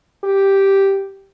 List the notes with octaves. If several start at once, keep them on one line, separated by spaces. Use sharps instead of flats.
G4